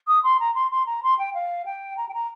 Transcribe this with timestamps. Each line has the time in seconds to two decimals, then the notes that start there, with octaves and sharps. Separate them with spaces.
0.07 D#6
0.23 C6
0.39 A#5
0.54 C6
0.71 C6
0.86 A#5
1.03 C6
1.18 G5
1.34 F5
1.65 G5
1.97 A#5
2.08 G5
2.13 A#5